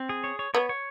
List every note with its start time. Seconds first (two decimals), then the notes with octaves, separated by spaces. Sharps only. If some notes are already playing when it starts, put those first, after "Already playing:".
Already playing: C4
0.09 G#4
0.24 C#5
0.39 C#5
0.54 B3 C#5
0.69 C#5